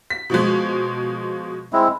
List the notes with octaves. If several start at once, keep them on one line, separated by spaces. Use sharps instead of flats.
B6
B2 F3 G#3
G#3 C4 E4